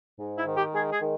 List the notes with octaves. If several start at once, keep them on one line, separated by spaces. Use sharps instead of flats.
G#2
E4
D#3
G4
G#3 G#4
G#4
D#3